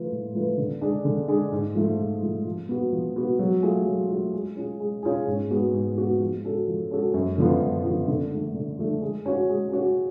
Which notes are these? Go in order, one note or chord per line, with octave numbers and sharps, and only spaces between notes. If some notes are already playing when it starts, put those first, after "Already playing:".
Already playing: F3 A3 F4 B4
A2
F3 A3 F4 B4
D3
G#3 D4
D3
G#3 D4
G#2
F3 A3 F4
G#2
F3 A3 F4
F3
B3 F#4
F3
B3 F#4
F#3
A3 F4 G#4
F#3
A3 F4 G#4
G#3
C#4 F4 G#4
G#3
C#4 F4 G#4
G#2
G#3 B3 F#4
G#2
G#3 B3 F#4
F3
G#3 C#4 F#4 A4
F3
G#3 C#4 F#4 A4
F#2
D3 F3 B3 F4
F#2
D3 F3 B3 F4
D3
F3 A3 D4
D3
F3 A3 D4
G#3
C#4 F#4 C#5
G#3
C#4 F#4 C#5